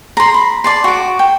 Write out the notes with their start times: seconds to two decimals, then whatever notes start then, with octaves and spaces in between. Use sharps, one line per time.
0.17 A#5 C6
0.34 B5
0.64 D5 A5 C6
0.84 F#4 D6
1.19 G5